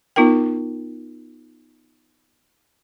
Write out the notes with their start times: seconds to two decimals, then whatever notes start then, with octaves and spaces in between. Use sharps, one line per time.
0.16 B3 D#4 F4 A#4 G5